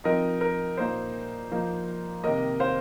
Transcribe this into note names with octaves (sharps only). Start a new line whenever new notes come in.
F3 C4 D#4 A#4 D#5
A#4
A#2 A#3 D#4 C5
F3 A#3 D#4
C3 D#3 A#3 A#4 D#5
C5 F5